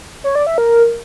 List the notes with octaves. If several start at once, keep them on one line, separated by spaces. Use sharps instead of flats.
C#5
D5
E5
A#4